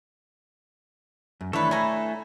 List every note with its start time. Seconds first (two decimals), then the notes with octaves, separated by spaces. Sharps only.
1.41 F#2
1.53 D#3 E3 A3 D4 E4 A4 B4 C#5
1.71 C#5 G#5 A#5 B5